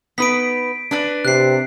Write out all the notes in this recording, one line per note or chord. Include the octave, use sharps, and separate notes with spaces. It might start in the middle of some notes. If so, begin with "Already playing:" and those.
B3 D#4 B4 B6 D7
D4 B4 D5
C3 F#6 C7